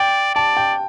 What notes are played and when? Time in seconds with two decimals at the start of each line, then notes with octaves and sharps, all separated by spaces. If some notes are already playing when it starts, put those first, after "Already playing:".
Already playing: D5 G5
0.35 D5 A5
0.57 G5